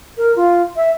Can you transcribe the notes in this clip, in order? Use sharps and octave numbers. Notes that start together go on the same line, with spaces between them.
A#4
F4
E5